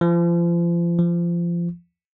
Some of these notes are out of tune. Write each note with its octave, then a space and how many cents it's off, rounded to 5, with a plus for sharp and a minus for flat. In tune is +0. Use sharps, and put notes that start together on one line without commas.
F3 -35
F3 -25